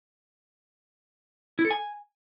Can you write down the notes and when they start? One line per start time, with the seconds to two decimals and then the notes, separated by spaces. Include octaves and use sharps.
1.59 E4
1.65 A4
1.71 G#5